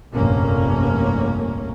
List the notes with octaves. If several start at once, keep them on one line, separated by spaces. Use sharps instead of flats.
F1 A#1 G2 A#3 C#4